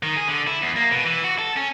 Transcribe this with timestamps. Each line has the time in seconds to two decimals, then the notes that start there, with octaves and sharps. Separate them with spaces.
0.03 D#3
0.16 G#4
0.28 D3
0.47 E4
0.62 E2
0.76 A#3
0.91 B2
1.05 E3
1.24 F#4
1.39 A4
1.56 C#4